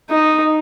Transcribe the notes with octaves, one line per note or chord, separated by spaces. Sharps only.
D#4